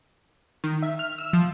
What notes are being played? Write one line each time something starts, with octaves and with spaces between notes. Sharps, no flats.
D#3
E5
F6
E6
F3